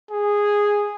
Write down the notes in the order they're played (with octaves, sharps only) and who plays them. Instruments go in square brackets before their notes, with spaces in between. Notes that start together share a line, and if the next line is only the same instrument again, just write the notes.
[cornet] G#4